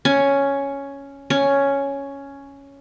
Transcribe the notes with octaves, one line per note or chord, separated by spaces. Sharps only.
C#4
C#4